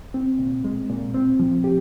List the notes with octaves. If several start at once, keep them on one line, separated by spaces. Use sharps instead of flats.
C4
A#2
G#3
A#2
C4
F3
G4